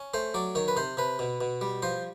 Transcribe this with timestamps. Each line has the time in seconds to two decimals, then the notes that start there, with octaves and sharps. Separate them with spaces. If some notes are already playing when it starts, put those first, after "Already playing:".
Already playing: C#4
0.14 A3 C5
0.34 F#3 D5
0.55 D#3 C#5
0.68 B4
0.77 C3 C5
0.97 C3 B4
1.19 B2
1.41 B2
1.61 G3
1.82 F3 C5